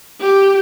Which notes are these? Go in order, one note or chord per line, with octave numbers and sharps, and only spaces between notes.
G4